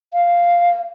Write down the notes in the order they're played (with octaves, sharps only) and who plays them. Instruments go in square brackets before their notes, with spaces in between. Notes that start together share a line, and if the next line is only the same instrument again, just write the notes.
[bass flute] F5